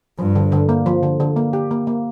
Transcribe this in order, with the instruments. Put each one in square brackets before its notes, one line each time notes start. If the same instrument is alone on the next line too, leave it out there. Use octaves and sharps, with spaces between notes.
[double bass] G2 [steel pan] F3
[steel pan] D3
D3
A#3
F3
D3
D3
A#3
G4
A#3
A#3